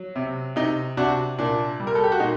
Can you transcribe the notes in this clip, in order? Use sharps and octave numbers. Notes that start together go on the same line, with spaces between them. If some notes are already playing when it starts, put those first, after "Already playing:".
Already playing: F#3
C3
C3 D#4
C3 D4 F#4
A#2 D4
G3
A#4
A4
G4
F#4
A#2 D#4